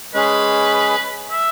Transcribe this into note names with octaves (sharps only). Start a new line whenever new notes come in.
G#3 C#4 G#4 B4
E5